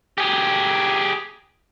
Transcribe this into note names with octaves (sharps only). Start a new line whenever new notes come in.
G4 G#4